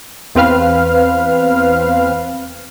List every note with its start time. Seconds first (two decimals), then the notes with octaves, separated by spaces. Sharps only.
0.35 E2 C4 B4 F5 F6